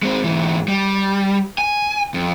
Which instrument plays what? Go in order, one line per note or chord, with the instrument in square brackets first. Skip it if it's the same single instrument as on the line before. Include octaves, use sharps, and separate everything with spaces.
[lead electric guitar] G#3 C4
G#2 E3
G3
G#5
F2